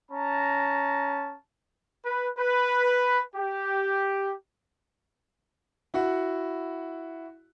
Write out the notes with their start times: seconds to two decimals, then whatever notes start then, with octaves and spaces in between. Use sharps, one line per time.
0.11 C#4 A5 A#5
2.04 B4
2.38 B4
3.36 G4
5.94 E4 F#4 F#5